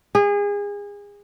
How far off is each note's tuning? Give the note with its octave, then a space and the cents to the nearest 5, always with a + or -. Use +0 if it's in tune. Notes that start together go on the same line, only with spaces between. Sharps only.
G#4 -30